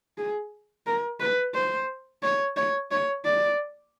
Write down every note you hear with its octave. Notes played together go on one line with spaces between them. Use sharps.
G#4
A#4
B4
C5
C#5
C#5
C#5
D5